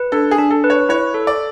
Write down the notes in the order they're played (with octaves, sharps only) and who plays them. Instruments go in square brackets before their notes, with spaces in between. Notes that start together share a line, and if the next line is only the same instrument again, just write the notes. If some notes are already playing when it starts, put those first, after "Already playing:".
Already playing: [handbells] B4
[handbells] D4 [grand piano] A4
[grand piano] G#4
[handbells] D4
[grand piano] A4
[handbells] B4
[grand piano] C#5
[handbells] E4 [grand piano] C#5
[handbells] A4
[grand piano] D5